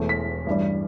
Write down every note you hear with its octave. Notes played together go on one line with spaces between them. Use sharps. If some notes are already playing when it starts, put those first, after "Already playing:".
Already playing: E1 E2 E3 A3
B6
A1 G2 G3